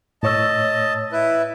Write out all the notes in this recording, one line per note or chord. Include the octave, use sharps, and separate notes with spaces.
A2 C#5 D#5 A5 E6
E4 B4